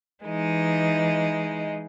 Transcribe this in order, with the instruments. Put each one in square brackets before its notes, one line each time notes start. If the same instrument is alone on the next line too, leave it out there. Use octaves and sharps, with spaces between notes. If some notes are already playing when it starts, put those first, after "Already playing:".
[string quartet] E3 G#3 D#4